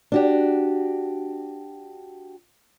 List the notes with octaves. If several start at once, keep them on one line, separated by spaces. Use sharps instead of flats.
D4 F#4 G4